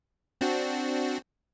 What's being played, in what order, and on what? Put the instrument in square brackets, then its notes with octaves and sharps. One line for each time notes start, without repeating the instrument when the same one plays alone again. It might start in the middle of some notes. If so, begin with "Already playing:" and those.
[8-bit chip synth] C4 D4 F#4